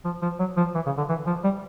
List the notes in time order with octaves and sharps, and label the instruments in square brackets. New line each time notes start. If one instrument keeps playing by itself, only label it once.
[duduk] F3
F3
F#3
F3
E3
C#3
D3
E3
F3
G3